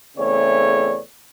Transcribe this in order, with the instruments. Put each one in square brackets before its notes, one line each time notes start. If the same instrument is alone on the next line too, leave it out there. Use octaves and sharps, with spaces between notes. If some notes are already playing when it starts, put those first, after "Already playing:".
[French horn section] E2 C#3 A3 C4 C#5 D5